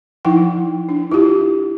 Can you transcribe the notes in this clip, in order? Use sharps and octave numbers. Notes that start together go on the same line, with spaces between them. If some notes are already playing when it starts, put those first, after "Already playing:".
F3 D#4 E4 F#5 G5
D4
E4 F4 G4